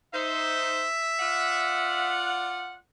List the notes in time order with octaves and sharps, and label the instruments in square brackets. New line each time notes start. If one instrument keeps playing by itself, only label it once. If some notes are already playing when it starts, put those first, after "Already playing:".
[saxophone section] D#4 C5 [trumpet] E5
[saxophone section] F4 D5 F#5